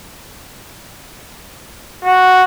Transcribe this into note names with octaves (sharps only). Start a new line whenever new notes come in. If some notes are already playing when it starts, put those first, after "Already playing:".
F#4